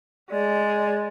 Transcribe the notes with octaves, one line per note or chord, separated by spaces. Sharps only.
G#3 D5